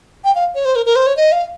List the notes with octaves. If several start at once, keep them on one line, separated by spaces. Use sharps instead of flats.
G5
F5
C#5
C5
A#4
A#4
C5
C#5
D#5
F5